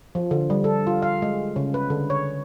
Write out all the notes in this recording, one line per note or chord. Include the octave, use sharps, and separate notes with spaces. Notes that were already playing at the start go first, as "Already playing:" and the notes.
F3
D3
G3
A4
F4
F5
G#3
C#3
B4
D3
C#5